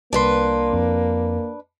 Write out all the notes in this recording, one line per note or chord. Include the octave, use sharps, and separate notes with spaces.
C2 A#3 D4 B4 C6
F2